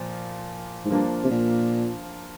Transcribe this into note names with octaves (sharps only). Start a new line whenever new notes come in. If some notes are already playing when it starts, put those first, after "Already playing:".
Already playing: A#2 F3
G#2
G2 F3 A#3 D4
C3
A#2